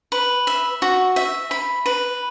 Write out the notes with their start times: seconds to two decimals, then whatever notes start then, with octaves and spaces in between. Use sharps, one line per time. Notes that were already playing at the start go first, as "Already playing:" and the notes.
0.12 B4
0.47 E5
0.82 F#4
1.16 E5
1.51 B5
1.86 B4